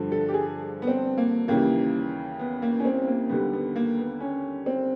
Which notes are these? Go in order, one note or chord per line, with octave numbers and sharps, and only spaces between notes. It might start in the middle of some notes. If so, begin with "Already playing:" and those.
Already playing: G2 D3 F3
A4
G4
G#4
B3
C4
A#3
D#2 C#3 E3 G3 A#3
B3
A#3
C#4
C4
A#3
D#2 D3 G3 B3
B3
A#3
B3
C#4
C4